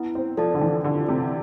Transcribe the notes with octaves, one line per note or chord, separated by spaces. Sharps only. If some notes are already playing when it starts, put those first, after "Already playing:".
Already playing: B3 E4
C4
F3 A4 D5 A5
D3
E3
D3 G4
C3